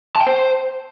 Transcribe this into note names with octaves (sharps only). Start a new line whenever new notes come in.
A5
G5
C5